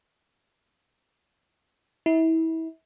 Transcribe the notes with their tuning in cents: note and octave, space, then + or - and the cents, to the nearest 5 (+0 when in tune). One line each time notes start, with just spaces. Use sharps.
E4 -30